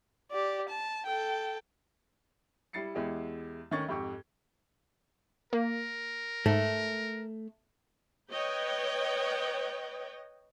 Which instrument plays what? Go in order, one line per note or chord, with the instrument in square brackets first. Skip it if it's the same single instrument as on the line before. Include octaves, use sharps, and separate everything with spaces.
[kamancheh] G4 D5
A5
A4 G5
[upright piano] G3 E4 A6 C7 C#7
E2 G#3 E4 G4
D2 D#3 C#4 C#6 G#6 A6
F2 G#2 G4 C#6
[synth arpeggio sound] A#3 [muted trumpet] A#4
[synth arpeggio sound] G#2 [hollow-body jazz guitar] A3
[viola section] B4 C#5 D#5 G5